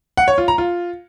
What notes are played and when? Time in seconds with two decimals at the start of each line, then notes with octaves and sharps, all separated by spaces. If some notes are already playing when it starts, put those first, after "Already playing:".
0.17 F#5
0.28 C#5
0.38 F4
0.48 A#5
0.58 F4